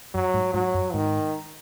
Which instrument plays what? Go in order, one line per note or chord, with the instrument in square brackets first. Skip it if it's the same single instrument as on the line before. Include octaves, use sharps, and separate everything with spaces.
[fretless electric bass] F#2 [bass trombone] F#3
[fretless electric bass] G#2
[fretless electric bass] G#2 [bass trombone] F#3
[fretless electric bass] F#2
[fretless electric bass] G#2 [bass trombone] D#3